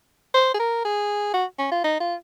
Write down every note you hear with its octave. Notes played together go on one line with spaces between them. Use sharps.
C5
G#4
A#4
G#4
F#4
C#4
F4
D#4
F4